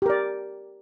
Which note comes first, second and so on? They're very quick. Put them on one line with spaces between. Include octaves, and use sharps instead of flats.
G4 A#4 D5